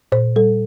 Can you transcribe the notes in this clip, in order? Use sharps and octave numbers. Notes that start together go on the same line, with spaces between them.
A#2 C5
G3 A4